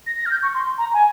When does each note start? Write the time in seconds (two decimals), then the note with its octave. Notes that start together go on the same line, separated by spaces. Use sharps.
0.07 A#6
0.18 A#6
0.26 F6
0.31 G6
0.43 C#6
0.54 C6
0.78 A#5
0.94 G#5